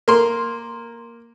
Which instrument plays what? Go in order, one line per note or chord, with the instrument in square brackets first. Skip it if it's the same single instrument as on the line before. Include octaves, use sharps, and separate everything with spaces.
[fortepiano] A#3 C6